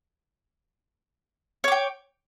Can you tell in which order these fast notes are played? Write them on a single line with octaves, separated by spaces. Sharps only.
C#5 D6 G5